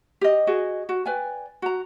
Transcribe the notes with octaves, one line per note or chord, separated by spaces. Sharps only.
G4 D#5
F#4 G#4 D#5
F#4
B4 D5 G5 G#5
F#4 A#5